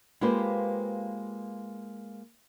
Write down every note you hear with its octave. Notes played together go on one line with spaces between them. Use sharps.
G#3 A#3 F4 G4 B4 C5